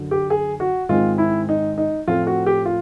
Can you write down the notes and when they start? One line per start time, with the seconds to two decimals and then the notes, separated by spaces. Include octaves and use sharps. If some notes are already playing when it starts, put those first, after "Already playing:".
Already playing: F#2 D3 F#3
0.11 G4
0.30 G#4
0.60 F#4
0.89 G#2 D#3 G#3 C4 F4
1.18 E4
1.49 D#4
1.78 D#4
2.07 A2 F3 A3 C4 F4
2.27 F#4
2.46 G4
2.65 F4